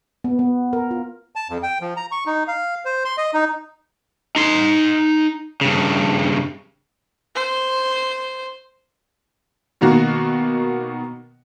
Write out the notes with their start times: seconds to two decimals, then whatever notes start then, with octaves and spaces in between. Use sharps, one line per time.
0.24 B3
0.39 B3
0.73 A#4
0.91 F4
1.36 A5
1.50 F2
1.63 G5
1.81 F3
1.97 A#5
2.12 C#6
2.26 D#4
2.48 F5
2.85 C5
3.05 C6
3.18 D#5
3.34 D#4
4.36 D#4 C6
5.61 G2 C#3
7.35 C5
9.81 B2 D#3 A#3 F#4